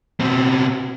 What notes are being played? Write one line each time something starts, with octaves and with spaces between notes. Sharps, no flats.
B2 C4